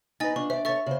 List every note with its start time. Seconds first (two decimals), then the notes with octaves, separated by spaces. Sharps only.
0.20 D#4 B4 D#5 G#5 A6
0.36 D4 F4 C#6
0.50 C5 D5 E5
0.65 A4 C#5 E5 C#6 A6
0.86 C#3 C5